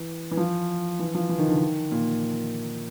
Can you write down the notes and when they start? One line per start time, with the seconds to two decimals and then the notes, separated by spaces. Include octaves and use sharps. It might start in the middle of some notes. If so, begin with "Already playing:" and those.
Already playing: E3
0.31 E3
0.37 F3
0.99 E3
1.15 F3
1.29 E3
1.38 D#3
1.48 D3
1.56 D#3
1.91 A#2